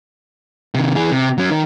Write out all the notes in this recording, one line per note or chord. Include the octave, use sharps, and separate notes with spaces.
C3 D#3
E3 G#4
C3
F#3 C#4
D#3